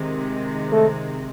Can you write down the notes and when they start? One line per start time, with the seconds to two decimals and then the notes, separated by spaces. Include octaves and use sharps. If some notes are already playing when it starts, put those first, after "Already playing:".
Already playing: C3 D#3 G#3
0.72 A3